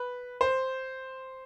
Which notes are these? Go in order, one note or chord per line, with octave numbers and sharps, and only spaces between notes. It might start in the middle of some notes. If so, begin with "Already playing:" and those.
Already playing: B4
C5